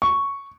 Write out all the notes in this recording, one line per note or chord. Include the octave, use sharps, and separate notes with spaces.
C#6